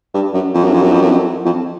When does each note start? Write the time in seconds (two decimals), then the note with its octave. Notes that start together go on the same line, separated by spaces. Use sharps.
0.14 G2
0.34 F#2
0.54 F2
0.64 F#2
0.73 F2
0.82 F#2
0.92 F2
1.01 F#2
1.11 F2
1.45 F2